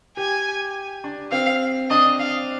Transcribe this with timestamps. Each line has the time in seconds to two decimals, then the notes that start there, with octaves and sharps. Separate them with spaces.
0.17 G4 G#5
1.04 D4
1.32 C4 F5
1.90 D4 D#5
2.19 F5